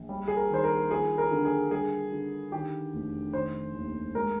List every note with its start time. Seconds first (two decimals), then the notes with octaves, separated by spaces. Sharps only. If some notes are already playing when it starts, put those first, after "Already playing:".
Already playing: A#1
0.09 G3
0.28 G#4
0.37 A#4
0.50 D#3 C5
0.64 A#4
0.90 F3 G#4
1.18 A#4
1.31 D3
1.45 G#4
1.71 G3 G#4
2.12 D3
2.52 D#3 G4
2.93 F1
3.33 D#3 C5
3.75 D#2
4.15 G#3 A#4